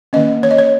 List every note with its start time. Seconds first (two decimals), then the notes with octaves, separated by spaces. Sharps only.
0.13 D#3 A#3 C#4 D#5
0.43 C#5
0.51 D#5
0.58 C#5